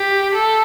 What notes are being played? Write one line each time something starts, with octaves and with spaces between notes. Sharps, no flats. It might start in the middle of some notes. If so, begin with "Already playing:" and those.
Already playing: G4
A4